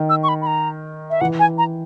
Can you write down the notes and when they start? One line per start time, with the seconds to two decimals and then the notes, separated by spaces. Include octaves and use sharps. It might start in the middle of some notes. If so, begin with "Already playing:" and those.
Already playing: D#3
0.09 E6
0.23 C#6
0.29 B5
0.42 B5
0.47 A#5
1.10 E5
1.21 E3 F#5
1.39 G#5
1.58 A#5